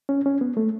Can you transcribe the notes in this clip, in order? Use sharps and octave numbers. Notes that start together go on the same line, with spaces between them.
C#4
C#4
B3
A3